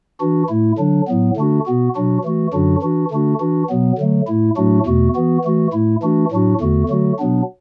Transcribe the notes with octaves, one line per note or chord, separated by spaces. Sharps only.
E3 D4 F#4
A2 A3 E4
D3 F#3 D4
A2 F#3 B3
D3 A3 D4 F#4
B2 B3 F#4
B2 F#3 D4 F#4
E3 A3 F#4
F#2 D3 F#3 D4 F#4
E3 D4 F#4
D3 A3 D4 F#4
E3 D4 F#4
B2 F#3 B3
D3 F#3 A3
A2 A3 E4
A2 F#3 A3 D4 F#4
E2 B2 A3 F#4
E3 B3 F#4
E3 A3 F#4
A2 A3 E4
E3 A3 D4 F#4
A2 F#3 D4 F#4
E2 D3 A3 F#4
D3 F#3 A3 F#4
B2 F#3 B3 D4